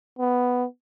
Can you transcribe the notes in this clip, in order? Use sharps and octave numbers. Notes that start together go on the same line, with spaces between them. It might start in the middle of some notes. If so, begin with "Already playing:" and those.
B3